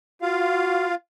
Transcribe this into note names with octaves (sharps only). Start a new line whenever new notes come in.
F4 F#4 F5